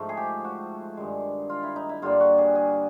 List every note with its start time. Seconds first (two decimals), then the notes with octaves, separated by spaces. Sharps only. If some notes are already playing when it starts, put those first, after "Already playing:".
Already playing: G#2 F3 A3
0.09 G#4
0.17 G4
0.44 F#4
0.97 G2 D#3 G#3
1.49 F4
1.63 E4
1.76 D#4
1.89 E4
2.02 G2 D3 G3 A#3 F4
2.20 F#4
2.38 G#4
2.55 G#4